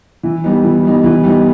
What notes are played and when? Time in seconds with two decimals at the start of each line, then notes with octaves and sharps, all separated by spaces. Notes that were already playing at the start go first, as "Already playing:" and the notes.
0.23 E3
0.44 G3 B3 D#4
0.64 E3
0.83 G3 B3 D#4
1.04 E3
1.23 G3 B3 D#4